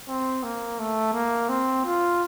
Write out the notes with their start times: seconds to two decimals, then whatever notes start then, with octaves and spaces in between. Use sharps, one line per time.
0.08 C4
0.43 A#3
0.79 A3
1.13 A#3
1.49 C4
1.85 F4